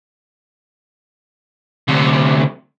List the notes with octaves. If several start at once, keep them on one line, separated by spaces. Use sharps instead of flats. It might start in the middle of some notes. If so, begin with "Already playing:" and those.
D2 C3